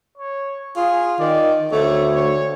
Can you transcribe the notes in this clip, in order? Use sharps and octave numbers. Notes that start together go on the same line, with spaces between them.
C#5
F4 G#4
D#3 D5
D2 A3 C#5
C#5